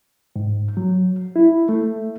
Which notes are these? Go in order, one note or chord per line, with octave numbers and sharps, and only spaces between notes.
G#2
F#3
E4
A3